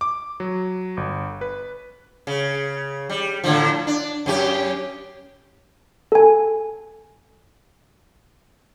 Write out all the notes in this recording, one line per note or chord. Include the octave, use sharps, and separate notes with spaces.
D6
F#3
G1
B4
C#3
G3
A2 D3 F3
D4
F#2 C#4 G4
A4 G#5